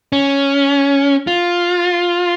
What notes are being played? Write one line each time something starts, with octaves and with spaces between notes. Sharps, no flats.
C#4
F4